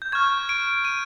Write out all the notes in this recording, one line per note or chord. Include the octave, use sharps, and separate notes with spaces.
G6
C#6 F6 G#6
D7
D#7